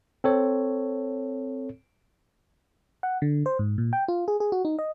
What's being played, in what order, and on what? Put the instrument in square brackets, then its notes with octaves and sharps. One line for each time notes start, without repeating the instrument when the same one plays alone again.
[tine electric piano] C4 A4 C#5
[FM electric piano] F#5
D3
C5
G#2
A#2
G5
F4
G#4
G#4
F#4
D#4
D#5